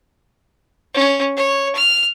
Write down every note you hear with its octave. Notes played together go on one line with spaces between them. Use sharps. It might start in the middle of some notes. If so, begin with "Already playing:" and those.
C#4
C#5
F6